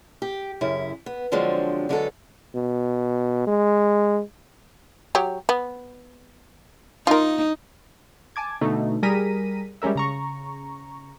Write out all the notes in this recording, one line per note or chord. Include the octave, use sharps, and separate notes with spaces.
G4
F#2 C#3 E4
B3
D3 F3 F#3 G#3 C4 D4
D3 F#3 G#3 B3 F4 A4
B2
G#3
F#3 G4 C#5
B3
D#4 F4 A#4
G#5 A5 D6 G#6
B2 D3 A3 D#4
G3 G#4 A#4 A#6 B6 D#7
G3 G#3 C#4 A#4 E5
C#3 A#5 C#6